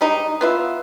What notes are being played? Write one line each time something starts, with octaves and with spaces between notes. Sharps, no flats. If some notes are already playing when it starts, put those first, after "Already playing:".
G3 G#3 D#4
B3 F4 E5